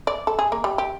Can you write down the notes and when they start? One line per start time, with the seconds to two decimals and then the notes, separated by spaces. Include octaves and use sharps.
0.07 D5
0.27 A4
0.39 G#4
0.52 A#3
0.64 G3
0.78 G4